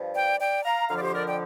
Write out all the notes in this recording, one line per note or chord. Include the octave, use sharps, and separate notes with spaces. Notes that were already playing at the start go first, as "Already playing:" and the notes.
Already playing: G2 F3
D5 G5
D5 G5
F5 A#5
F2 D3 F3 F5 A#5
D5
G4 C5
A#4 D5
D5 G5